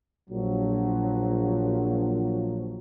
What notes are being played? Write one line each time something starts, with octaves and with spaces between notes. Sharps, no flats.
A#1 F3 F#3